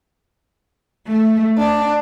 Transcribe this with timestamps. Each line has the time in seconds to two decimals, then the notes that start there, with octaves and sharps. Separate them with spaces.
1.08 A3
1.58 D4